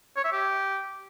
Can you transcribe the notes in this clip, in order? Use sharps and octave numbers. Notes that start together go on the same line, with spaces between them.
C#5
E5
G4